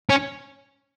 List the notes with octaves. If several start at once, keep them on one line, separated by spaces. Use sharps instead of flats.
C#4